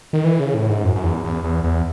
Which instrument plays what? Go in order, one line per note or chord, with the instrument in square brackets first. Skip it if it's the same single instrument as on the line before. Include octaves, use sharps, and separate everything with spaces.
[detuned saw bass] D#3
E3
C#3
A2
G#2
F#2
F#2
E2
E2
E2
E2